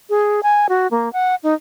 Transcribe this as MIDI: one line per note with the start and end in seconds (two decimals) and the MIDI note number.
0.10 0.40 68
0.43 0.67 80
0.69 0.87 66
0.91 1.11 58
1.13 1.35 78
1.43 1.54 63